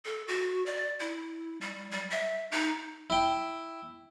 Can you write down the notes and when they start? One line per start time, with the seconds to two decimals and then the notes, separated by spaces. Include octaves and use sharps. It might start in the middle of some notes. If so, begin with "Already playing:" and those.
0.05 A4
0.28 F#4
0.66 D5
1.00 E4
1.61 G3
1.91 G3
2.10 E5
2.51 D#4
3.10 E4 G5